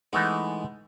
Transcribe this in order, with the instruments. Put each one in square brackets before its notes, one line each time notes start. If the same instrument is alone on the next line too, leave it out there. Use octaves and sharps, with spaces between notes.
[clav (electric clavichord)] E3 A3 D#4 [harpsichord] G#3 B3